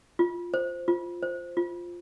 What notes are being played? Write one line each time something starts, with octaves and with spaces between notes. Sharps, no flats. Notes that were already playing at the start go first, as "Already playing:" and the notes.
F4
C5
F4
C5
F4